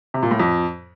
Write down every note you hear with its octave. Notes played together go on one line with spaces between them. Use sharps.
C3
A#2
A2
F2